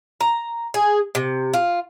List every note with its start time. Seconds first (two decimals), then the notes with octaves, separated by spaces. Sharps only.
0.21 A#5
0.74 G#4
1.15 C3
1.53 F4